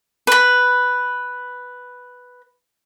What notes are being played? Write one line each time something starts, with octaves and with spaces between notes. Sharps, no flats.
B4 B5